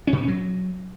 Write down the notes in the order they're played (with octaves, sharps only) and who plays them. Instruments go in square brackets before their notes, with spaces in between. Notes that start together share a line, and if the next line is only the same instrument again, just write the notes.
[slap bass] C#4
A#2
C4
C#4
F#3